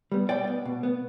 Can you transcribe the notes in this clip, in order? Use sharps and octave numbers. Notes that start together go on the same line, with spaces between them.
G3 B3
B2 D5 G5
B3
B2
B3